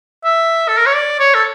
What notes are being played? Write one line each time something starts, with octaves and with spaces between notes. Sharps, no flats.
E5
A4
A#4
C#5
D5
C#5
A4